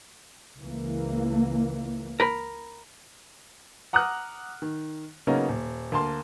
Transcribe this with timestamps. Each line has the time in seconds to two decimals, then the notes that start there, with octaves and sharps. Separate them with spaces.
0.58 C#2 E3 A#3
2.20 A#4 B5
3.93 F#5 A#5 D6 D#6 F6 F#6
4.62 D#3
5.27 C#3 F#3 A#3 B3 C#4 D#4
5.49 D#1
5.92 D2 A#3 A5 C6